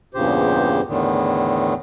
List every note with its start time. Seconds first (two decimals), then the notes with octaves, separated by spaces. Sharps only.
0.14 E2 G2 A#2 C#3 G4 C5
0.87 E2 A2 D3 D#3